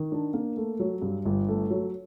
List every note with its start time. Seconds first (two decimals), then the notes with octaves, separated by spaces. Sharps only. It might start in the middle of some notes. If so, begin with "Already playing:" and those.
Already playing: D#3
0.12 D4
0.34 A#3
0.57 A3
0.80 F#3
1.02 G2
1.25 G1
1.48 A3
1.70 F#3